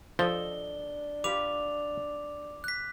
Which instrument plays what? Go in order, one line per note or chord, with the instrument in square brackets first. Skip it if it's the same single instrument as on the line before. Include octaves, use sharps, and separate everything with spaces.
[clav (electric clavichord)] F3 [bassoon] D4 [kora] A4 D#5 G5 [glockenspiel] G7
[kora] F4 G4 B4 [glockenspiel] D6 F7
[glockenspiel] F#6 B6